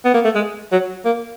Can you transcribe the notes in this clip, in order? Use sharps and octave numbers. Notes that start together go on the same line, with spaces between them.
B3
A#3
A3
G#3
F#3
A#3